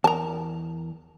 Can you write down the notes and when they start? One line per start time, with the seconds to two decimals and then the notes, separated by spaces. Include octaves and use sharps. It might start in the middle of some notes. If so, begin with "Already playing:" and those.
0.04 E2 A#4 A5 A#5